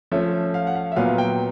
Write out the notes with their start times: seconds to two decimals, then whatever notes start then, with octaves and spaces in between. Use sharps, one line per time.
0.12 F3 A3 C#4 E5
0.54 F5
0.67 F#5
0.75 F5
0.92 E5
0.96 A#2 F#3 B3 F5
1.18 G5